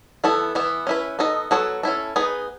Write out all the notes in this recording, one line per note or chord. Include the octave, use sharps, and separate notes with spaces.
E3 B3 E4 A4
E3 B3 E4
C#4 E4 B4
B3 D#4 A4 D#5
F#3 B3 F#4 A4 C#5
C#4 E4 A4
B3 D#4 G#4 B4